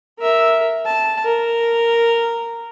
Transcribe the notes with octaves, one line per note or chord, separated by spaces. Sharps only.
A#4 E5
A5
A#4